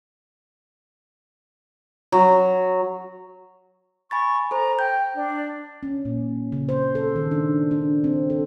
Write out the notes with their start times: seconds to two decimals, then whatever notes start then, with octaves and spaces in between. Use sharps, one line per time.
2.12 F#3
4.11 G#5 B5 C#6 A6
4.51 A4 C5 A#5
4.79 G5 G6
5.15 D4
5.83 C#4
6.05 A#2
6.52 C#3
6.69 C5
6.95 A4
7.16 D#3
7.31 D4
7.71 D4
8.04 C4
8.30 A4